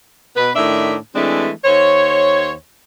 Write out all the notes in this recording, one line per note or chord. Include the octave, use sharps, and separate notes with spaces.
B2 B4
A2 D#3 D4 E5
E3 G#3 A3 C4 D4
D#2 C5 C#5